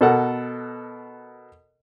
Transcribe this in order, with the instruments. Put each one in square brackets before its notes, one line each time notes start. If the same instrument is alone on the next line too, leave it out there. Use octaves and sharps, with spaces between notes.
[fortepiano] B2 A4 A#4 F#5